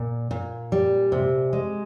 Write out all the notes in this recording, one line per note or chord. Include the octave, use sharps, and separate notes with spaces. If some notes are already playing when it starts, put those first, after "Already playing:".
Already playing: A#2
A#2
G3
C3
G#3